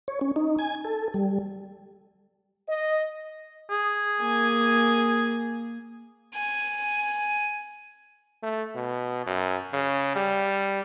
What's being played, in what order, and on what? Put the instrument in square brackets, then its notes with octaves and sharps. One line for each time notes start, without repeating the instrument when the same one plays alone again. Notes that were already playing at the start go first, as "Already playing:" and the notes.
[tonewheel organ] C#5
C#4
D#4
G#5
A4
G3
[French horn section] D#5
[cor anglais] G#4
[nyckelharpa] A#3 G#5
[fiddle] G#5
[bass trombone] A3
B2
F#2
C#3
G3